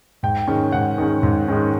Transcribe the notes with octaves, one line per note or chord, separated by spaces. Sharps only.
G#2 G5
D#3 G#3 C#4
G#2 F#5
D#3 G#3 C#4
G#2
D#3 G#3 C#4